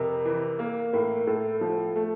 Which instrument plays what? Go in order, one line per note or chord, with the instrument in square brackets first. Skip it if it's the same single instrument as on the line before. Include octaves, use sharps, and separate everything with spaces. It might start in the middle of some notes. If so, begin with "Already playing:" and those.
Already playing: [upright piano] F2 C3 [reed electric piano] A#4
[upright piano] E3
A#3
[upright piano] A2 [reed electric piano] A#4
[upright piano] A2 [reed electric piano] A4
[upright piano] F3
A3